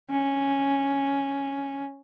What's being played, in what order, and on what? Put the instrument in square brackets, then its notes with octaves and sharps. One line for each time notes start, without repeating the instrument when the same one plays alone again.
[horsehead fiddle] C#4